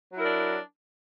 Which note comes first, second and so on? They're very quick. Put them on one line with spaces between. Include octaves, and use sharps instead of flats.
F#3 E4 A#4 D4